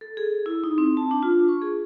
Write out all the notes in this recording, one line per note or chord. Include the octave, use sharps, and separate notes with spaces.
A4
G#4
E4
D#4
C4
A5
D4
F4
C#6
G#4